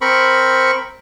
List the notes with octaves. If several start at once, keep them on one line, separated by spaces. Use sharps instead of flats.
C4 A#4 B5 C#6